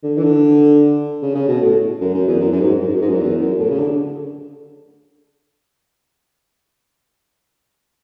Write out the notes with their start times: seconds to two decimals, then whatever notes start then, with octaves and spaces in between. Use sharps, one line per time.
0.03 D3
0.17 E3
0.23 D3
1.22 C#3
1.35 C#3
1.48 B2
1.61 A2
2.01 F#2
2.14 F#2
2.27 E2
2.40 F#2
2.52 F#2
2.60 G#2
2.80 F#2
2.88 G#2
2.94 F#2
3.02 G#2
3.09 F#2
3.20 E2
3.39 F#2
3.60 A2
3.69 C#3
3.79 D3